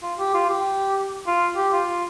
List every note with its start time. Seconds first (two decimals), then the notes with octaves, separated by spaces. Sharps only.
0.03 F4
0.19 G4
0.34 F4
0.49 G4
1.27 F4
1.57 G4
1.73 F4